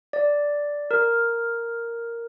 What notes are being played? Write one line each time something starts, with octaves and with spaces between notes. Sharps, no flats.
D5
A#4